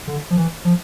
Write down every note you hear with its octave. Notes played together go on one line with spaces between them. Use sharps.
D3
F3
E3
F3